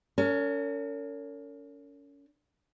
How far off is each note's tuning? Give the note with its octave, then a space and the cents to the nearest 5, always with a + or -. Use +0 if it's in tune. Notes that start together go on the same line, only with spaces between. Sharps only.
C#4 +30 A#4 -40